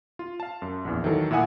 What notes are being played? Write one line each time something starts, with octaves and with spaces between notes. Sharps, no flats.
F4
F5 A5
F#2
A#1 E2
D#3 E3 F#3 A4 A#4
A#2 E4 E5 F#5 G#5 D#6